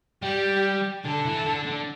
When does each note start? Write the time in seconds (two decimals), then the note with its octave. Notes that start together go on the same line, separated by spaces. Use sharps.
0.22 G3 G4
1.05 D3 A4
1.25 E3
1.46 D3
1.66 D3